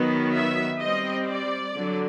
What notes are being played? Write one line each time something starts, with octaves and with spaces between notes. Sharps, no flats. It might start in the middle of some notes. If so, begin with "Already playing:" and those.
Already playing: D#3 F#3 B3
E5
G3 C4 D#5
D5
D3 F#3